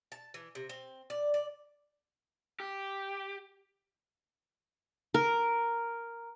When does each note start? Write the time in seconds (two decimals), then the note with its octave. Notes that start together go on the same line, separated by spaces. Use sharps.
0.12 A5
0.34 E3
0.55 C3
0.69 C4
1.10 D5
1.34 D5
2.60 G4
5.14 A#4